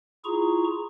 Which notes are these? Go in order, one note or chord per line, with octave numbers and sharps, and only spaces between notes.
E4 F4 G#4 A#5 C#6